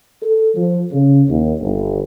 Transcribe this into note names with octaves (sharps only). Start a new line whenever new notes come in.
A4
F3
C#3
D#2
G1